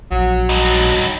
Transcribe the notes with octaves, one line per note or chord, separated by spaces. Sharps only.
A#1 F#3
G2 D#4